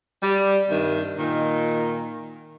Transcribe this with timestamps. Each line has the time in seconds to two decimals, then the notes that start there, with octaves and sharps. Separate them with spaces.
0.23 G3
0.69 G2 C3 D#3
1.18 A#2 D#3